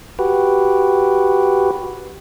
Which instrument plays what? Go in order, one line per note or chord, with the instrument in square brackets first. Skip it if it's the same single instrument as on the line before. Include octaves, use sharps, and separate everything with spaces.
[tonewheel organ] F#4 G4 B4